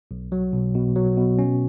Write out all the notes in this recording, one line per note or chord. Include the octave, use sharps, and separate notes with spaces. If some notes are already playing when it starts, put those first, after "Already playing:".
B1
F#3
B2
B2
F#3
B2
C#4